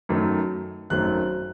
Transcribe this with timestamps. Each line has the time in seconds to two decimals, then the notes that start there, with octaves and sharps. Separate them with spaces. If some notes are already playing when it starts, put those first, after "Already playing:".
0.09 F#2 D#3 F#3 A3
0.90 G#1 F#2 D#3 F#3 A3 F#6